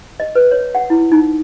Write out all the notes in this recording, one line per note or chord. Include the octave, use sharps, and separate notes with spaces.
D#5
B4
C#5
F#5
E4
D#4